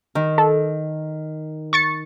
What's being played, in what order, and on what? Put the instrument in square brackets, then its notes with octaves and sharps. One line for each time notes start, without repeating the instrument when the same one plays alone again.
[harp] D#3
[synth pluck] A4
C#6 A6 C#7